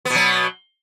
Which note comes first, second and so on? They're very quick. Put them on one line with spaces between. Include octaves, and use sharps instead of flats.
B3 B2 F#3